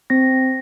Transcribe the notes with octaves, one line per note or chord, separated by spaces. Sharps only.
C4 A#6